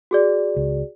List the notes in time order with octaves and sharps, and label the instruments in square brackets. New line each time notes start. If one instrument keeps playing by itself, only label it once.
[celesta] F#4 G#4 D5
[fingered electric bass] C#2